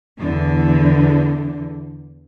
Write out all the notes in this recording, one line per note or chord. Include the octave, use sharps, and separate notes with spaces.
E2 D3